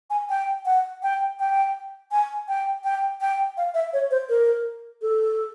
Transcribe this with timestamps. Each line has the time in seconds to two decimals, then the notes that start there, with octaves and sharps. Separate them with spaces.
0.10 G#5
0.30 G5
0.66 F#5
1.03 G5
1.39 G5
2.12 G#5
2.48 G5
2.84 G5
3.21 G5
3.57 F5
3.74 E5
3.93 C#5
4.11 C5
4.29 A#4
5.02 A4